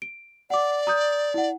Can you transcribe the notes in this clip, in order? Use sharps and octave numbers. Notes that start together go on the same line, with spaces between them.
D7
D5 F#5 D6
A#5 D#6 G6
E4 F#5